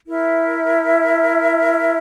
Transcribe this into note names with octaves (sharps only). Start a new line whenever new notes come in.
E4 A#4 E5